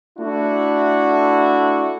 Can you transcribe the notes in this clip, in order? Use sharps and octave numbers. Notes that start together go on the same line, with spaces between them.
A3 D4 E4 F#4